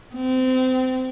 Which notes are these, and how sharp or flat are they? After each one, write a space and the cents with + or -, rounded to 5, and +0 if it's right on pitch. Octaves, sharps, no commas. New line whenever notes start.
C4 -25